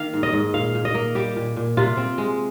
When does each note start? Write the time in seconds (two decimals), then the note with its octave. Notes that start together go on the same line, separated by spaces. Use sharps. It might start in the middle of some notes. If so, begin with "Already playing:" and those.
Already playing: D#3 A#3 F5
0.13 G#2
0.23 D#5
0.33 G#2
0.54 A#2 F5
0.75 A#2
0.85 D#5
0.94 A#3
1.15 G3 G4
1.36 A#2
1.56 A#2
1.77 C3 F4
1.97 C4
2.18 G#3